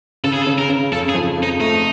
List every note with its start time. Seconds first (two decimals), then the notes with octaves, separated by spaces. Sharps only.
0.24 C#3 A4
0.33 G#4
0.43 A4
0.47 C#3
0.58 A#4
0.69 C#3
0.92 F2 A4
1.09 G#4
1.15 F3
1.37 F2
1.43 D#4
1.60 A3 D#4